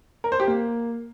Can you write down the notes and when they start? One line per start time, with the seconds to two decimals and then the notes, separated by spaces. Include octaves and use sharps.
0.24 A#4
0.32 C5
0.40 G4
0.48 A#3